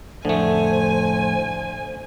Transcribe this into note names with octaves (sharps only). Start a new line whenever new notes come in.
F2 A2 D3 A3 C5 G#5